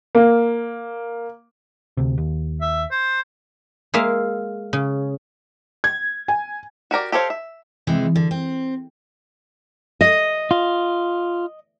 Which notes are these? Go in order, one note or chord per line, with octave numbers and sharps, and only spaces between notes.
A#3
D2 C3
D#2
E5
C5
G#3 A#3 E5 F5
C#3
G#6
G#5
F#4 G4 A#4 D5
G4 A4 C5 C#5 F5
E5
C3 E3 G#3
D3
C4
D#5
F4